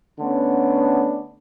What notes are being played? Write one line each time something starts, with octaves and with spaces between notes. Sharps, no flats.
D3 A3 B3 C#4 D4